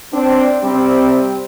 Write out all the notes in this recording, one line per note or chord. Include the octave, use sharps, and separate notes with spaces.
C4 D4
C3 G3 C4